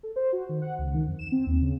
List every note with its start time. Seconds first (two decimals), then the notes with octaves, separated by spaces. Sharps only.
0.03 A4
0.16 C5
0.32 F#4
0.49 D#3
0.62 F#5
0.78 C#2
0.94 D#3
1.07 F2
1.19 E7
1.32 C4
1.46 D#2
1.61 C#3